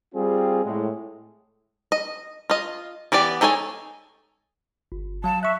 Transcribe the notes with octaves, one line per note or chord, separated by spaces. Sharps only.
G3 C4 F4 G#4
A2 G#3
D#5
F4 D#5
E3 B3 G4 D5
G#3 D#4 A4 C#5 G#5
G1
F#3 F5 A5
E5 C#6 F#6